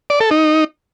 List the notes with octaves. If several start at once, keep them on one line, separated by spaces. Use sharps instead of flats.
D5
A4
D#4